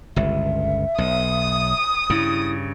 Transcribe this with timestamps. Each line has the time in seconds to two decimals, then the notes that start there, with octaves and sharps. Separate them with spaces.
0.16 G1 C#2 E5
0.98 B1 D#6
2.10 G2 C#3 E4